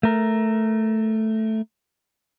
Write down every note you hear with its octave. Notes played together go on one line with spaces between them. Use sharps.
A3 A#4